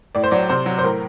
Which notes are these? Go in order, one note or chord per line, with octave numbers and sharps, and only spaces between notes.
A2 D5
C5
F#3 D5
C3 C5
F#3
C5
A2 A#4